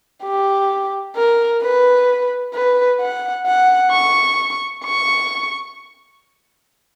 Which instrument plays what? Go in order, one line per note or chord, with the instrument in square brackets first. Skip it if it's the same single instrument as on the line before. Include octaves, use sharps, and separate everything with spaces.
[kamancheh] G4
A#4
B4
B4
F#5
F#5
C#6
C#6